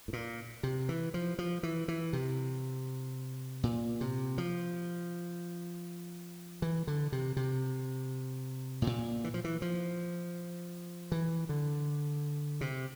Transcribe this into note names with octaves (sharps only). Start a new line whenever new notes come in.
A2
A#2
C3
E3
F3
F3
E3
E3
C3
A#2
C3
F3
E3
D3
C3
C3
A2
A#2
E3
F3
E3
F3
E3
D3
C3